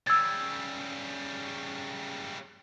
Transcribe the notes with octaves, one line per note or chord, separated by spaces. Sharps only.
C#3 G3 E6 G#6 A6